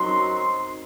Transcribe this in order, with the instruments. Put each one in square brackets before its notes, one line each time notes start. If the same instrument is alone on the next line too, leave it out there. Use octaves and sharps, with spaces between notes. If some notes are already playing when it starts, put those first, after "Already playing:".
Already playing: [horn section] F#2 F#3 C4 D#4 C6